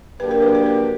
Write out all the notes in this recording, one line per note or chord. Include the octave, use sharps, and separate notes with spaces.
D3 F#3 A#3 D4 G4 B4
A#4
B4
B4
A#4